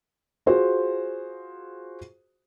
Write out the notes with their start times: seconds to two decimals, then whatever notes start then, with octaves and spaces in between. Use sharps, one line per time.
0.46 F4 F#4 G#4 C5